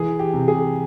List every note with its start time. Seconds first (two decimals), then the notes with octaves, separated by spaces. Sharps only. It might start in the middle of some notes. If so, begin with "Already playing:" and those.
Already playing: E3 G#4
0.19 G4
0.33 C3
0.48 G#4